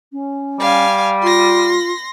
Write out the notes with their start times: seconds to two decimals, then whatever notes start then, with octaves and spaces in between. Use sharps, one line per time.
0.12 C#4
0.60 G3 F5 G#5
1.22 F4 C6 A#6